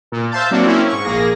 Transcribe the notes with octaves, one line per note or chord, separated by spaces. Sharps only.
A#2
C5 E5 F5 A5 G6 A6
F#3 A#3 C4 D4 F#4
A#3 C4 C#4 E4
G#2 C#6
A#1 A#3 G#4 A#6